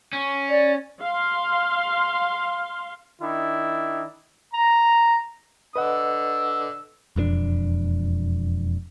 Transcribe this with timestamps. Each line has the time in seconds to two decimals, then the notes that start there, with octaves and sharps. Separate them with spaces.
0.13 C#4
0.49 D5
1.01 F5 C6
3.21 D#3 D4 E4
4.54 A#5
5.76 D3 B4 D#5 F#5 E6
7.16 E1 F2 G#3 D4